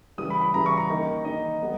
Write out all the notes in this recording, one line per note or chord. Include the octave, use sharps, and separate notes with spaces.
C#3 E3 G3 D#6
B5
B5
C#3 E3 G3 A#5
C#6
A#5
D#3 A#3 D#4
D#3 A#3 D#4 D#5
G3 B3